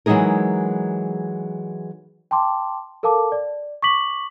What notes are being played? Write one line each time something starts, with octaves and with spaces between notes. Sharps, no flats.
E3 F#3 G#3 D#4 G#4 A#4
G5 A5 C6 D6
A4 A#4 F5 A5 D6
D5
C#6 D6 B6 F#7